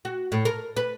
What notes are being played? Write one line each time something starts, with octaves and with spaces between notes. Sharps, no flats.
F#4
A2
A#4
B4